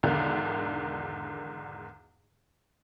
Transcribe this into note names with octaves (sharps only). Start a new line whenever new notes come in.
B1 E2 G#2 D3 D#3